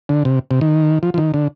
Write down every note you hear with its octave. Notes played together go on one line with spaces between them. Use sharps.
D3
C3
C3
D#3
F3
F3
D#3
D3